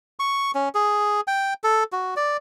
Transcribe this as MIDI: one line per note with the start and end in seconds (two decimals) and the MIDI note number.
0.20 0.51 85
0.55 0.69 61
0.75 1.21 68
1.28 1.54 79
1.64 1.84 69
1.92 2.14 66
2.16 2.37 74